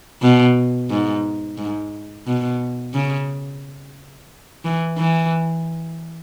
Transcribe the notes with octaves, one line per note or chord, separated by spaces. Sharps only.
B2
G#2
G#2
B2
C#3
E3
E3